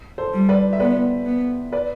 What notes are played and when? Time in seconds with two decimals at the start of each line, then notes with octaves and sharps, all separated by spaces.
0.18 A4 C5
0.33 G3
0.49 B4 D5
0.73 E5
0.80 B3 B4 D5
1.26 B3
1.72 B4 D5